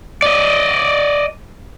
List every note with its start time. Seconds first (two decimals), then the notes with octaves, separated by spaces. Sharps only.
0.22 D5 D#5